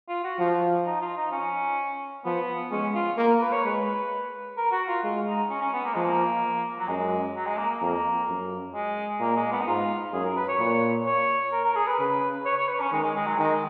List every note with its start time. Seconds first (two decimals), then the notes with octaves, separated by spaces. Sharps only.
0.08 F4
0.24 F#4
0.39 F3 F4
0.86 D#4
1.01 F4
1.17 D#4
1.32 C#4
2.25 F3 B3
2.71 G#3 C#4
2.94 F4
3.17 A#3 A#4
3.29 A#4
3.41 B4
3.52 C#5
3.64 G#3 B4
4.57 A#4
4.72 F#4
4.88 F4
5.03 G#3 F4
5.27 D#4
5.50 C#4
5.61 C#4
5.73 B3
5.84 A#3
5.94 F3 G#3
6.05 A#3
6.78 F#3
6.88 F#2 G#3
7.35 F#3
7.46 G#3
7.58 A#3
7.70 A#3
7.81 F2
8.28 F#2
8.74 G#3
9.20 A#2 A#3
9.36 G#3
9.52 B3
9.61 D#4
9.67 G#2 F4
10.13 F#2 G#4
10.25 A#4
10.36 B4
10.48 C#5
10.59 A#2
11.06 C#5
11.52 A#4
11.65 A#4
11.76 G#4
11.87 B4
11.99 C#3 B4
12.45 C#5
12.57 C#5
12.69 B4
12.80 C#4
12.92 D#3 G#3
13.03 G#3
13.15 G#3
13.26 F#3
13.38 D#3 G#3